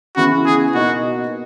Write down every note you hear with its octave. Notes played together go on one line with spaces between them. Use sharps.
C#3 E3 B3 E4 F#4
G#4
B2 A#3 D#4 F#4